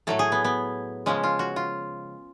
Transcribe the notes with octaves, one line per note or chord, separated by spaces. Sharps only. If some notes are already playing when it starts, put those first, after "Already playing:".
A2 F#3 A3 A4
G#4
B3
B3
C#3 F3 G#3 C#4
F4
F#4
F4